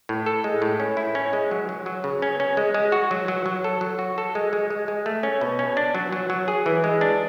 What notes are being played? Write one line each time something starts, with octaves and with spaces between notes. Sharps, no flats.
A2
A4
G#3
A2
C#4
E4
C#4
G#3
F#3
F#3
F#3
C#3
C#4
C#4
G#3
G#3
F#4
F#3
F#3
F#3
A4
F#3
F#4
A4
G#3
G#3
G#3
G#3
A3
C#4
B2
C#4
D4
F#3
F#3
F#3
G#4
E3
G#3
D4